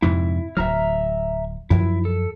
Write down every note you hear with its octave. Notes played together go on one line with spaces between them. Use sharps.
F2 G#2 C3 E4
D1 F#3 E5 A#5 F6
F#2 F3 F#3 E4
A4